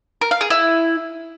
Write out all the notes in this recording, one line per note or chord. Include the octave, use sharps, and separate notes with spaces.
A#4
F5
G#4
E4